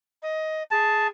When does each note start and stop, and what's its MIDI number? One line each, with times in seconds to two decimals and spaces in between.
0.22 0.63 75
0.71 1.08 68
0.71 1.07 81